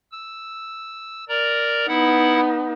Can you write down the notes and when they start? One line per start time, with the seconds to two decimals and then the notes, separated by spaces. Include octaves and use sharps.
0.12 E6
1.29 A#4 D5 A#5
1.88 B3 D#4 E4 F#5 B5